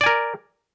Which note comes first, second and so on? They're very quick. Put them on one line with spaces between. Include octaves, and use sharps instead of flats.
D5 G#5 A#4